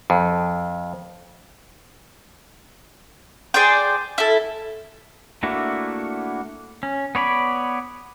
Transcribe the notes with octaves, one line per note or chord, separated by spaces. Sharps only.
F2
G#4 C5 D5 G5
E4 A4
A3 A#3 D4 E4 F#4
C#4
B3 C#5 D5 B5